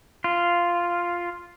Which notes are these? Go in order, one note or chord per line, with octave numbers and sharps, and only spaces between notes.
F4